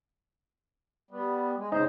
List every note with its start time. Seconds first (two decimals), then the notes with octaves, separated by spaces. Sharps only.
1.11 G3 B3
1.58 G#3
1.72 F2 C#3 D#4 C5 D#5